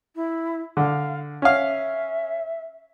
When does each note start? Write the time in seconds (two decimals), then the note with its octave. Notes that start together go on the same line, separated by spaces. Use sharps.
0.15 E4
0.77 D3 F5
1.42 C#4 E5 F5